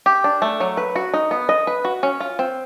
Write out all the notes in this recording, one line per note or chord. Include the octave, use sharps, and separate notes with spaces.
G4
D4
A3
F#3
B4
F#4
D#4
B3
D#5
B4
F#4
C#4
F4
C4